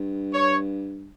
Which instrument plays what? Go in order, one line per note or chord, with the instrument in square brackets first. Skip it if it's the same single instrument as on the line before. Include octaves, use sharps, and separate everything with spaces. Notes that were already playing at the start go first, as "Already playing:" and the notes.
Already playing: [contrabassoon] G2
[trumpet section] C#5